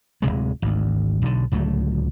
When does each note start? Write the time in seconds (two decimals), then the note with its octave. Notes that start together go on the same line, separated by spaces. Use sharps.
0.22 D1 C2 C3 G#3
0.62 G#1 D2
1.22 B1 D3
1.52 D1 C#2 F#3 A3